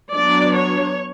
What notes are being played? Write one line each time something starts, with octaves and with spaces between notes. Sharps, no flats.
F#3 B3 D4 D5
C#5